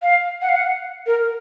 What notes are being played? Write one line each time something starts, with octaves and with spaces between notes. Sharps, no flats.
F5
F#5
F5
F#5
A#4